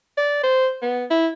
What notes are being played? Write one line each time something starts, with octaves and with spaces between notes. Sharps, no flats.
D5
C5
B3
E4